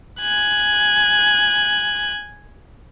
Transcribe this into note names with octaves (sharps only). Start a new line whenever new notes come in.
G#5 F#6